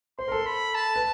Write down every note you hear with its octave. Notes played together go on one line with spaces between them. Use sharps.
C5 C6
A#4
A4
B5
A5
B4